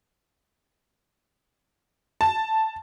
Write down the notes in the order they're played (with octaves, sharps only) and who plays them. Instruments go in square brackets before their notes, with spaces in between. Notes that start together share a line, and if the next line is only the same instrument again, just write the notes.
[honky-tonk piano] A5